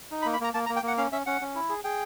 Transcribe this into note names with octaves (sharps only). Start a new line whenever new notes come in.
D#4
B5
A#3
B5
A#3 A#5
A#3 A5
A#5
A#3
G5
A#3 F#5
C#4 F5
C#4 E5
C#4 F#5
C#4
E4
G#4
G#4 G5